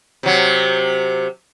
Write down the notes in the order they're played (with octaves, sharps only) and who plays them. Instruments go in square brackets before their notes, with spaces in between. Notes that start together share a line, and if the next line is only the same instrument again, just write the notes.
[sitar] C3 F#3